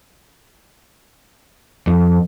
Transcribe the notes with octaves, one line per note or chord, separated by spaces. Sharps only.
F2